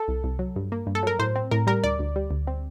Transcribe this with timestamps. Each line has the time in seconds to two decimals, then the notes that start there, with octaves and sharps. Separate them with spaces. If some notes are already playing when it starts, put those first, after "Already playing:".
Already playing: A4
0.08 C2
0.24 C2
0.39 F#3
0.56 G2
0.72 A#3
0.87 G2
0.95 A4
1.03 F#3 A#4
1.19 A2 C5
1.36 C4
1.51 A2 A#4
1.67 G3 A#4
1.84 D2 D5
1.99 D2
2.16 G3
2.31 D2
2.47 C4